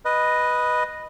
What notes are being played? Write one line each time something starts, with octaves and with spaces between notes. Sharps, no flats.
B4 D#5